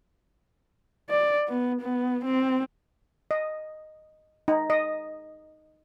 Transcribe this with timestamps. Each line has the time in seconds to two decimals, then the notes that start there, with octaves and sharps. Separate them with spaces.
1.09 D5
1.48 B3
1.81 B3
2.25 C4
3.31 D#5
4.48 D#4
4.70 D#5